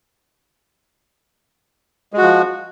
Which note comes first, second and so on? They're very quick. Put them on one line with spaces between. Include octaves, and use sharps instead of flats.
G#3 F#4 F3